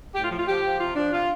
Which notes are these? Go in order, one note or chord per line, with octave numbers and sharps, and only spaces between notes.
A2 G4
F4
F3
F4
F3 G4
F3
C3 F4
F3 D4
C3 F4